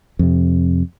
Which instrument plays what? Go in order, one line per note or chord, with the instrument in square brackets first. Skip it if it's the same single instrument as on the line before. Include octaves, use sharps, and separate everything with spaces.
[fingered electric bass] F2 C3